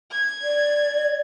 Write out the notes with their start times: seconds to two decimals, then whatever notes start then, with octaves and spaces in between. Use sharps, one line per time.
0.11 G#6
0.43 D5